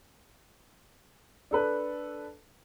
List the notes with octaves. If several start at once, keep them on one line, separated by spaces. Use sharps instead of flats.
D4 A4 B4